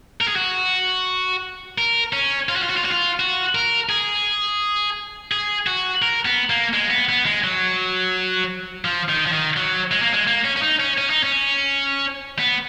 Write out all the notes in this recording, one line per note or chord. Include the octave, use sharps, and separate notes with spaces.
A#4
G#4
F#4
A#4
C#4
F4
F#4
F4
F#4
F4
F#4
F4
F#4
A#4
G#4
G#4
F#4
A#4
B3
A#3
G#3
B3
B3
G#3
F#3
F3
D#3
F3
D#3
F#3
G#3
A#3
G#3
A#3
C#4
C#4
D#4
C#4
C#4
D#4
C#4
B3